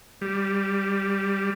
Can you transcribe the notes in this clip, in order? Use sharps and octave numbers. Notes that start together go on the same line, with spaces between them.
G3